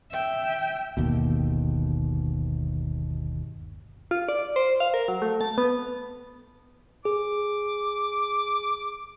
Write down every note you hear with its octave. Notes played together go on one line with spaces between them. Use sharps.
E5 G5
G1 D#2 B2
F4
D5
C5
F5
A#4
F#3
A3
A5
B3
G#4 D6